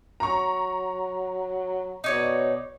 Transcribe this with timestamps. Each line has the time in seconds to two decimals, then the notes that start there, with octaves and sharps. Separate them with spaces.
0.20 F#3 A#5 C#6
2.04 B2 D#4 C#5 D5